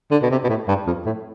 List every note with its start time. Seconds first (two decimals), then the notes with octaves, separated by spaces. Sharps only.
0.11 D3
0.23 B2
0.31 C3
0.44 B2
0.49 A2
0.68 G2
0.87 F2
1.06 A2